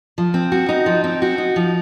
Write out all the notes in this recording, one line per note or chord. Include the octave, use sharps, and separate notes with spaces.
F3
C4
F#4
D#4
F3
C4
F#4
D#4
F3